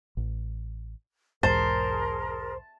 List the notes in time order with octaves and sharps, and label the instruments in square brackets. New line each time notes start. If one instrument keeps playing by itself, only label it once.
[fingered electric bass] A1
[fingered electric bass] B1 E2 G#2 [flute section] G#4 A#4 [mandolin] C5 [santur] A5